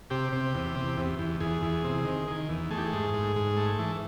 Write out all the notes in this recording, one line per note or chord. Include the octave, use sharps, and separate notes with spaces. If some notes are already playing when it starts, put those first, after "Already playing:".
C3 G4
C3
E2
C3
E2
E2
E2 G#4
E2
C3
D#3
D#3
E2
A3 G#4
G4
G#4
G#2
G#2
G#2
A3
E3